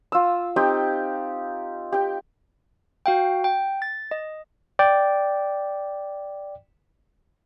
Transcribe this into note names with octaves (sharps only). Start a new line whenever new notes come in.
F4 E6
C4 D#4 G4 G5
G4 G5
F#4 F5 G5
G5
A6
D#5
D5 G5